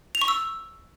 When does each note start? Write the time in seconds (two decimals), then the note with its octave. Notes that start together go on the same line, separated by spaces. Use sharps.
0.15 F7
0.21 C#6
0.28 E6